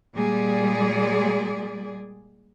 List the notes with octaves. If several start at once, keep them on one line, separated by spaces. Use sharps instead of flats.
A#2 G3 G#3 G#4 D5